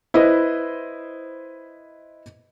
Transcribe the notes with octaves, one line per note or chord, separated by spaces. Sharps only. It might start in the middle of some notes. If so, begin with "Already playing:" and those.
E4 B4 C5 D#5